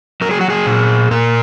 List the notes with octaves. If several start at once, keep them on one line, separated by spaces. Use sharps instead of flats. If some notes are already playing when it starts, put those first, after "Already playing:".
F#3 A#4
G#4
F#4
G#4
A#2
A#2 A#4